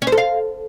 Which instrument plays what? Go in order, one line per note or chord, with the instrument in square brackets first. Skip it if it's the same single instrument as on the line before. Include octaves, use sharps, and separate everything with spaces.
[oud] C#4
C5
A4
F5